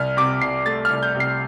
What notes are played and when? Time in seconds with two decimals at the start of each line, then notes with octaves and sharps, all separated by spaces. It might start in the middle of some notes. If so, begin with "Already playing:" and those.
Already playing: C2 F6
0.17 C3 D6
0.41 C2 C7
0.66 A3 A6
0.85 C2 F6
1.03 G6
1.15 C3
1.20 C7